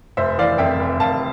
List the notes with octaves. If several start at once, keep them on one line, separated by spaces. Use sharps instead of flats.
F1 C5 E5
E3 D5 F5
F2 E5 G5
F1
F1 F5 A5